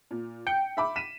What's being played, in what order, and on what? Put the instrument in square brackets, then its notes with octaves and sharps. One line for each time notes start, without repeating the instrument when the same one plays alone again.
[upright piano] A#2
[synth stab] G5 [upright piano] C#7
[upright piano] E5 B5 D6
B6 D#7 E7